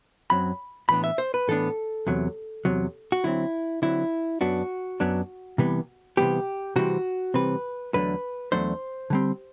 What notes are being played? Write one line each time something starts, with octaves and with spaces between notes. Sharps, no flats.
F#2 F#3 C4 B5
A2 E3 B3 D4 B5
E5
C5
B4
A2 E3 B3 D4 A4
E2 C3 F#3
E2 C3 F#3
F#4
D3 F#3 C4 E4
D3 F#3 C4 E4
F#2 F#3 B3 D4 F#4
F#2 F#3 B3 D4
C3 E3 G3 B3
C3 E3 G3 B3 G4
C3 E3 G3 C4 F#4
C3 E3 G3 C4 B4
E2 D3 F#3 A3 D4 B4
E2 D3 F#3 A3 D4 C5
D3 G3 C4